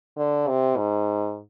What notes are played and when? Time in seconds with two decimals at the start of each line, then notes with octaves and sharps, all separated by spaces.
0.17 D3
0.48 C3
0.77 G#2